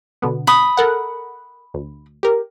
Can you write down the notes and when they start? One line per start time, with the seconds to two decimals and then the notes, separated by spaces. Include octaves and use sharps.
0.22 B2 D3 B3
0.47 B5 D#6
0.77 A4 A#4 F#5
1.74 D2
2.23 G4 A#4